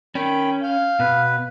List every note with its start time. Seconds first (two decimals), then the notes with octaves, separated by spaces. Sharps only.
0.15 D#3 C#4 G5 B5
0.63 F5 G6
1.00 B2 B4